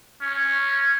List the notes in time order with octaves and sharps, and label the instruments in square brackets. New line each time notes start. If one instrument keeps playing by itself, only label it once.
[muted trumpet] C#4